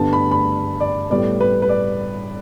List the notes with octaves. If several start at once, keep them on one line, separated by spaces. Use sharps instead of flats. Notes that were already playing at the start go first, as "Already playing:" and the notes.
Already playing: G2 D3 B3 A5
B5
B5
D5
A2 G3 B3 D5
B4
B4
D5